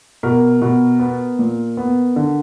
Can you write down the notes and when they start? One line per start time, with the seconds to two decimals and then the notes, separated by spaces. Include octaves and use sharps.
0.23 B2 A#4
0.62 B2
1.00 B3
1.39 A#2
1.77 B3
2.16 D3